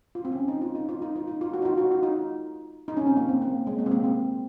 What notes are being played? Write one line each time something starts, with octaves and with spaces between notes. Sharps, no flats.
F4
C4
C#4
D#4
F4
D#4
F4
D#4
F4
D#4
F4
F#4
D#4
F4
F#4
F4
D#4
D#4
C#4
C4
A#3
C4
A#3
G#3
A#3
C4
A#3
C4